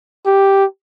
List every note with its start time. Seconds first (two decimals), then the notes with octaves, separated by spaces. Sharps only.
0.26 G4